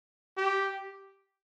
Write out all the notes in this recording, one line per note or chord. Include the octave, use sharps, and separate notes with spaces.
G4